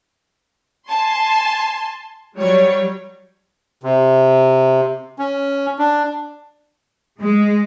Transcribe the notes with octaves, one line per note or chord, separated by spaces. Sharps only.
G#5 A5 C6
F#3 G3 C#5
C3
C#4
D4
G#3